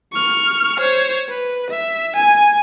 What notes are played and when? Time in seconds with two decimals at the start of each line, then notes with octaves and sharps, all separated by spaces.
0.12 C#6 F6
0.79 C5 C#5
1.29 B4
1.70 E5
2.16 G#5